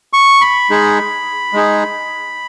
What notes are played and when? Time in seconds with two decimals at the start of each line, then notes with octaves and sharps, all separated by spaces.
0.13 C#6
0.41 B5
0.70 G#3 D#4 G#4
1.53 G#3 D#4 G#4